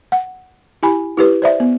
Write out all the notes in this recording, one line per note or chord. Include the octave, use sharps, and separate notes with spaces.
F#5
E4 G4 G#5 B5
E4 G4 B4
C5 D5 E5
B3